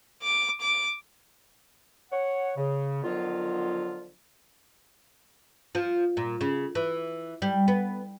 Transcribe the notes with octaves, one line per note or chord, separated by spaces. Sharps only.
D6
D6
C#5 F#5
C#3
D3 D#3 F3 F#3 B3 F4
F3
A#2
C#3
E3
G3
B3